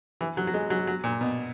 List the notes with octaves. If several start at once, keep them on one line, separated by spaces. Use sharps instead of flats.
E3
F#3
F#3
G#3
F#3
F#3
A#2
B2